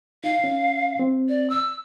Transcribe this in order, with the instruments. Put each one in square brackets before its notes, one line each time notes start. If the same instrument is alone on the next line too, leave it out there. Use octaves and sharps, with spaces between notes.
[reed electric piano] D#4 [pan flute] F5
[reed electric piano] C#4
C4
[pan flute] D5
E6